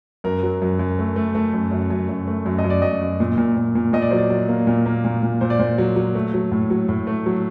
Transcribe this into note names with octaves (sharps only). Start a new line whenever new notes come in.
F#2 A#4
F#3
F#2
F#2
A3
A3
A3
F#2
F#2
F#2
F#2
A3
F#2
D#5
F#2
D5
F#2 D#5
F#2
A#2
A#2
A#2
A#2
A#2 D#5
D5
F#3 C5
D5
F#3
A#3
A#2
A#3
A#2
A#2
A#2 C5
D5
A#2 C5
F#3
F#3
A3
F#3
A2
F#3
A2
A3
F#3